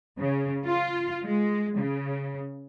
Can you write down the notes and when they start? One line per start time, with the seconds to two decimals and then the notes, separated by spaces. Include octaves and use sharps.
0.19 C#3
0.65 F4
1.25 G#3
1.77 C#3